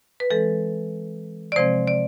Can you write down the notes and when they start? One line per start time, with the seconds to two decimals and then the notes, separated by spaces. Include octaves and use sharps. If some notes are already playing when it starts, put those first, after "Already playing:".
0.20 B4
0.30 E3 G#3 C4 A4
1.52 D5
1.56 C3 F3 G#3 C4 C5
1.88 D5